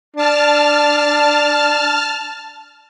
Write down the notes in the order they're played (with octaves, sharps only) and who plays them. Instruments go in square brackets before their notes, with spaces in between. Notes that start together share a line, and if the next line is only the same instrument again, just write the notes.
[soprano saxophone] D4 [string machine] A5 F6